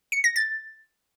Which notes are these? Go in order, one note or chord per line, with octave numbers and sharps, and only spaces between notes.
C#7
A#6
A6